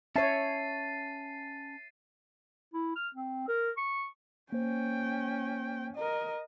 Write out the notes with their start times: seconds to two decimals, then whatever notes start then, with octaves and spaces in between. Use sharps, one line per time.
0.16 C#4 C#5 E5 A5 A6 C7 D#7
2.74 E4
2.96 F6
3.15 C4
3.48 A#4
3.78 C#6
4.52 A#3 C#4 C5 G5
5.96 A#4 D#5